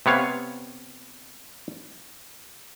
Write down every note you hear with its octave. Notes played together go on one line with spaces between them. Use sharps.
C3 B3 C#5 F5